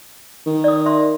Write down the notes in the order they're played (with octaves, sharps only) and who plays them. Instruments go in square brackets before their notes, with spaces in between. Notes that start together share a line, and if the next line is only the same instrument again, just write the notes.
[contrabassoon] D#3
[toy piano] D5 D#6
E5 C6